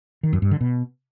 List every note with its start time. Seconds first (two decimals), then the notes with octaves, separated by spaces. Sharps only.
0.23 D#3
0.33 F#2
0.42 G2
0.51 D3
0.61 B2